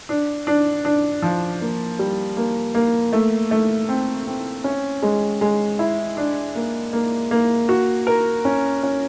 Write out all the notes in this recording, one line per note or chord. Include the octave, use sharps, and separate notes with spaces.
D4
D4
D4
F3
A#3
G3
A#3
A#3
A3
A3
C4
C4
C#4
G#3
G#3
E4
D4
A#3
A#3
A#3
F#4
A#4
C#4
C#4